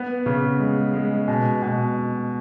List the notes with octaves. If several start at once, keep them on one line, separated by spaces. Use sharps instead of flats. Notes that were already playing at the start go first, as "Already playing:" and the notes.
Already playing: B3
C#3
G#3
G#3
B2
B2